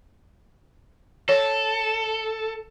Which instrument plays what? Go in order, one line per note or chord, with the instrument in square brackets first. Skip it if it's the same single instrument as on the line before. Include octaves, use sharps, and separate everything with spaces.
[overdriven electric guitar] A4 [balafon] C#5